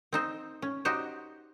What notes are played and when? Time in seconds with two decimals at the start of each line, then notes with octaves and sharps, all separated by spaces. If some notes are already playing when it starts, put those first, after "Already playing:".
0.13 C4 D#4 C5
0.62 C#4
0.85 D#4 F#4 G4 C5